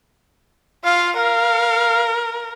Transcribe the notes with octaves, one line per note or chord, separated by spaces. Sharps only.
F4 F5
A#4 F5